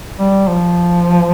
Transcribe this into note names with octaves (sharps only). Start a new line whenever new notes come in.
G3
F3